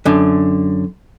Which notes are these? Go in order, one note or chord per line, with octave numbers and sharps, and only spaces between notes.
F#2 D3